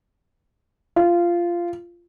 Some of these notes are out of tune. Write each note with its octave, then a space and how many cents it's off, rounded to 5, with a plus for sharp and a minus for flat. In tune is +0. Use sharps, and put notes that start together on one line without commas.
F4 -15